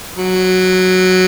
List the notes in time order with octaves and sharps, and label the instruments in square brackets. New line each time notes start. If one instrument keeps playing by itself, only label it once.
[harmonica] F#3